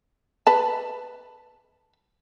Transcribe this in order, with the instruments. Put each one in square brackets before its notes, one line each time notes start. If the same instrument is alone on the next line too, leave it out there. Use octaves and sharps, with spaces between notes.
[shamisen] B4 A5